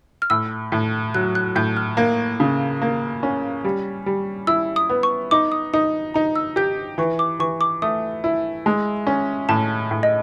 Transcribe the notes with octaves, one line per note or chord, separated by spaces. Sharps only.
F6
A2 E6
A2
F#3 F#6
F#6
A2 G6
F6
A#3
C#3
A#3
C#4
G3
G3
E4 E6
D#6
B3
C#6
D#4 D6
D#6
D#4 D#6
D#4 A#5
E6
G4 G6
E3 C#6
D6
E3 C#6
D6
A3 D#6
E4
G#3
C#4
A2 A5
A2
D#5